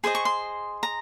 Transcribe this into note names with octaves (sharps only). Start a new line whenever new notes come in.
G#4 C5 D#5 C6
C#6
C6
A#5